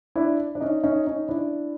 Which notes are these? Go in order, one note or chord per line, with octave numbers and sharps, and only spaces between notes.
D4 E4
D4
C#4 D#4
C#4 D#4
C#4 D#4
D4 E4